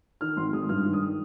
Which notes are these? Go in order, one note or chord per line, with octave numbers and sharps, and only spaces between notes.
D#3 F6
G#1 C6
G#3 D#6
G2 F6
D#3
D#6